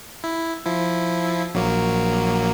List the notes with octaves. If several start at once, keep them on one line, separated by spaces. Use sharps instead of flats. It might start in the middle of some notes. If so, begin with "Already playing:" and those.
E4
F3 E4
A#1 F#3 A#3